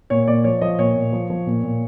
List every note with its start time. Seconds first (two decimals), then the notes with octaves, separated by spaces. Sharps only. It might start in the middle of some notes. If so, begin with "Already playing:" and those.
0.10 A#2 C#5
0.28 A#2 D5
0.44 F3 C#5
0.61 F3 D#5
0.79 A#2 C#5
0.95 A#2
1.12 F3
1.30 F3
1.46 A#2
1.63 A#2